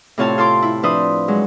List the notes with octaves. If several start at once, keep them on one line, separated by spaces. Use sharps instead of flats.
A2 C3 F4 C#5 F5 A5
F4 A4 C6 D6
E4
F3 D4 B4 C5 E5 D#6
F#3 G#3